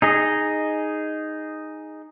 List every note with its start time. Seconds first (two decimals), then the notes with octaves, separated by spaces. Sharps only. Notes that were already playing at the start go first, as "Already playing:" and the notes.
0.02 D#4 G#4 D#5